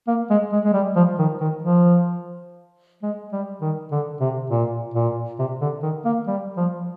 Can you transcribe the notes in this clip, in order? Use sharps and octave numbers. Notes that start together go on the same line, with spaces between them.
A#3
G#3
G#3
G#3
G3
F3
D#3
D#3
F3
G#3
G3
D#3
D3
C3
A#2
A#2
C3
D3
D#3
A#3
G3
F3